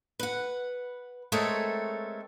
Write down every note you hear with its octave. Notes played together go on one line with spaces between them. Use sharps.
B4 F#5
G#3 A3 C4 A4 A#4 C#5